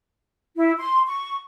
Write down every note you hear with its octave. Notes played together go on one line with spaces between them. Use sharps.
E4
C6
C#6